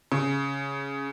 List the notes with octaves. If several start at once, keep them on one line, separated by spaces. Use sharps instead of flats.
C#3